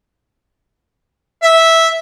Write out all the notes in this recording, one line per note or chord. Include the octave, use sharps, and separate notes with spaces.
E5